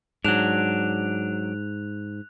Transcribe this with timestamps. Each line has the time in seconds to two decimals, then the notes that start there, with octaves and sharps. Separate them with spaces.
0.25 G#2 F#3 D4 F#6 F7